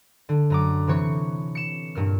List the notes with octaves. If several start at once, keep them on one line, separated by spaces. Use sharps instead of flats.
D3
F#2 A#5 D6
C3 E3 C#5 C#6
C#7 E7
G2 A#2 F6